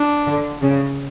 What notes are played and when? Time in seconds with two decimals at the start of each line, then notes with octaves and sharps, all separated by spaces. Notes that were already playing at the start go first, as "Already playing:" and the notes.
Already playing: D4
0.27 D3
0.62 C#3